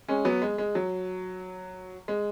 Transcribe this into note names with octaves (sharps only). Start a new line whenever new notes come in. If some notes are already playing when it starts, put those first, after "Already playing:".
G#3 C#4
F#3 B3
G#3
G#3
F#3
G#3